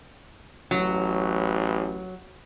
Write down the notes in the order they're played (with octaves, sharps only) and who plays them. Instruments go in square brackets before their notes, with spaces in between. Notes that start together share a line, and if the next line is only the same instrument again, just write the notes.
[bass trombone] A1 [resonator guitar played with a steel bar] F#3